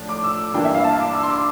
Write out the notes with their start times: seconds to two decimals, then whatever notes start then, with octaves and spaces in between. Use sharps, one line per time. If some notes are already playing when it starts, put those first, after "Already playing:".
Already playing: A2 F3 A3 D4
0.09 D6
0.24 E6
0.54 G2 E3 A#3 D4 G5
0.65 E5
0.74 F5
0.84 A5
1.00 D6
1.15 E6
1.23 C6
1.30 D6